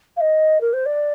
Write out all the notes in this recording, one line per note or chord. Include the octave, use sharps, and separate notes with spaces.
F5
D#5
A#4
C5
D5